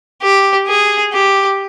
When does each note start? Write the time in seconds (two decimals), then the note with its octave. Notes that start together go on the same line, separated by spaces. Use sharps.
0.23 G4
0.68 G#4
1.13 G4